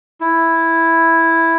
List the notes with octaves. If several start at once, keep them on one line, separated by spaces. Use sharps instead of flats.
E4